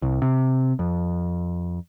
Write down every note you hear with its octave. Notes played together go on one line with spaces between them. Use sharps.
C2
C3
F2